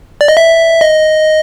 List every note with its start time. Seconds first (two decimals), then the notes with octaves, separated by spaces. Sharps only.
0.21 D5
0.28 D#5
0.37 E5
0.81 D#5